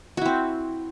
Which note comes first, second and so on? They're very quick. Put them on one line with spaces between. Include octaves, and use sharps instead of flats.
F#4 E4 C4